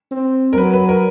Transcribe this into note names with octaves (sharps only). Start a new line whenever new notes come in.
C4
A#4
F#3 B4
B4
A#4